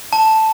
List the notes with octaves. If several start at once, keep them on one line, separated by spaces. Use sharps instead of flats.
A5